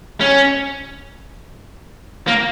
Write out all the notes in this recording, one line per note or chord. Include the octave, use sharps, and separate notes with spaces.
C#4
A#3